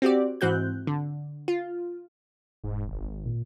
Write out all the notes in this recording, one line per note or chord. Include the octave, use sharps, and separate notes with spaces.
C4 F#4 G4 D5
G#2 E3 C4 F#4 F#6 G6
D3
F4
E1 G#2
G#1
A#2